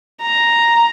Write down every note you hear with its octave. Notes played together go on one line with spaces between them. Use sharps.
A#5